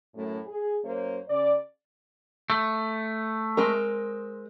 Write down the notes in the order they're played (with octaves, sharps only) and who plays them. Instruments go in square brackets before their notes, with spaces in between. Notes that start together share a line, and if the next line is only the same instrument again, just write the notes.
[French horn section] F#2 A2 A3
G#4
F#2 A#3 C5 C#5
C#3 D5
[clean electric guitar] A3
[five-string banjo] G#3 C4 A#4